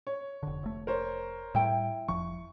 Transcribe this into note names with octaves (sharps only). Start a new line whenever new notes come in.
C#5
F1 D3
F1 A3
A#4 C5 C#5
A2 G3 E4 G5
F1 F3 C#6